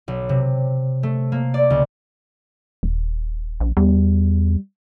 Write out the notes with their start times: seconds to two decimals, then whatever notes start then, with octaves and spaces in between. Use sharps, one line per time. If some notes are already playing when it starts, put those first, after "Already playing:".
0.08 B1
0.29 C3
1.03 A3
1.32 A#3
1.54 D5
1.70 C#2
2.83 D#1
3.60 A#1
3.77 E2 G3